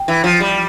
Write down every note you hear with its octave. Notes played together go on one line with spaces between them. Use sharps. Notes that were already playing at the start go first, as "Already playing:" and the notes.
Already playing: G5
E3
F3
G3